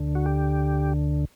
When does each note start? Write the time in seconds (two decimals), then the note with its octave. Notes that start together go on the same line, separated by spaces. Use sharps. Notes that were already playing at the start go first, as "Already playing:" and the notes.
Already playing: D2 D3
0.15 F#4
0.26 G4